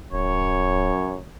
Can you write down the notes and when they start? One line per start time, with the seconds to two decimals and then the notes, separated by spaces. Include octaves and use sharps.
0.12 D1 F#2 C#5